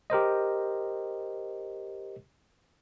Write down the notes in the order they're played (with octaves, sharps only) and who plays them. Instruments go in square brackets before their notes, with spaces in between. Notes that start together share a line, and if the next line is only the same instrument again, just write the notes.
[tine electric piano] G4 A#4 C5 D#5